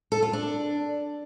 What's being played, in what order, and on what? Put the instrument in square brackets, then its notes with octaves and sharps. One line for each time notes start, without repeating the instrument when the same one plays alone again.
[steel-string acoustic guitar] A4
F4
D4